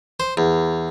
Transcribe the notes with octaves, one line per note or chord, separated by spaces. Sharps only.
C5
E2